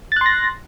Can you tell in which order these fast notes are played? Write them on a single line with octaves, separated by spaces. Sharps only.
A6 F#6 C6 A#6